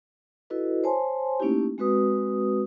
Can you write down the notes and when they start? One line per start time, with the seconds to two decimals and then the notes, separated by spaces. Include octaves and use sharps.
0.50 E4 F#4 A4 B4 D#5
0.84 C5 C#5 G#5 A5 C6
1.40 A3 A#3 C#4 D#4 E4 G4
1.78 G#3 C4 F#4 B4 D#6